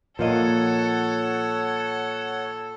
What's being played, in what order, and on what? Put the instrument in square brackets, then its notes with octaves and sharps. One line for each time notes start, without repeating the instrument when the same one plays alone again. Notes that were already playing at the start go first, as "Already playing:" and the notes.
[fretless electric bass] A#2 [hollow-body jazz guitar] F3 A#3 D#5 [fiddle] A4 [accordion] C#5 F#5